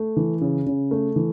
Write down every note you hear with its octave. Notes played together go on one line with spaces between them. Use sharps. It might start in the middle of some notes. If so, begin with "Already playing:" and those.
Already playing: A3
E3
C#3
C#3
A3
E3